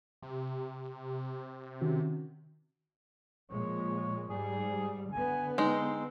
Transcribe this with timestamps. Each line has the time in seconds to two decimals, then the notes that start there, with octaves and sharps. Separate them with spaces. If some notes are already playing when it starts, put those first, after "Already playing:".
0.23 C3
1.81 D#3 C#4 F#4
3.51 A#2 F3 G#3 C#5
4.29 G#2 G3 G#4
5.12 D3 B3 G#5
5.58 G#3 C4 D#4